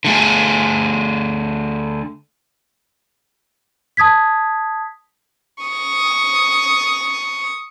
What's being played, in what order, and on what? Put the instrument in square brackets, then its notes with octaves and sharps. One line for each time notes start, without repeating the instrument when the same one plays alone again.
[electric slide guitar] D3 A3 G#4
[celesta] A5 D#6 G#6 B6
[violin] C#6 D#6